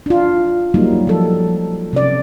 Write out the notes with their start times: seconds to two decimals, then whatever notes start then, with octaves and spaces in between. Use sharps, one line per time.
0.06 D4 F4
0.74 F#3 G3 A#3 D#4
1.07 F3 A4
1.93 C3 C#4 D5